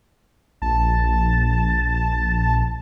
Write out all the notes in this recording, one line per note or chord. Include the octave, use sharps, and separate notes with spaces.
A#1 A5